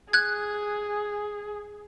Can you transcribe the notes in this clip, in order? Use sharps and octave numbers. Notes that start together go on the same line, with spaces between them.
G#4 F#6 G#6